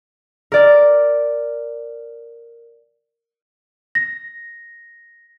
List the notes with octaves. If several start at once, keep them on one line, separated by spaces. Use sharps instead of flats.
A#4 D5
A#6